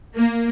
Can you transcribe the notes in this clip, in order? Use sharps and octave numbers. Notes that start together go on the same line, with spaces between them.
A#3